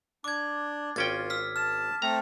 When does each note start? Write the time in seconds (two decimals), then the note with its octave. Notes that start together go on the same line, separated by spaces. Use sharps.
0.24 D4 D6 G#6
0.96 G#1 C#4 F4 G5 A6
1.30 E6 F6 B6
1.56 A5 F6
2.02 A3 C4 A4 A#5